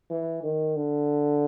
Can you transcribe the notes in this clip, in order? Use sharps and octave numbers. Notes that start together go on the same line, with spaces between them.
E3
D#3
D3